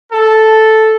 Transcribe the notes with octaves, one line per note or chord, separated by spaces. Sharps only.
A4